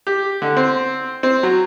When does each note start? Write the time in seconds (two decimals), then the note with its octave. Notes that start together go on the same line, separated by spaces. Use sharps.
0.07 G4
0.42 D3
0.57 C4
1.23 C4
1.43 F#3